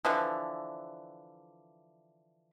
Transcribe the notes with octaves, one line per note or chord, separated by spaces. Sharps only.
D3 E3 F3